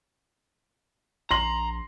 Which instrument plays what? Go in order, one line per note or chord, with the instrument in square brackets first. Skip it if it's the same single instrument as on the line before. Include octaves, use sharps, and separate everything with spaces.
[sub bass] A#1 [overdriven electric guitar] A#5 [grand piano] C6 A#6 F#7